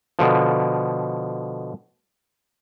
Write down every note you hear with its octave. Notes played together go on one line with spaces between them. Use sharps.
B2 D3 F3